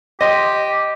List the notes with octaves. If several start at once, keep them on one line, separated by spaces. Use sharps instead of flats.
G4 D#5 C6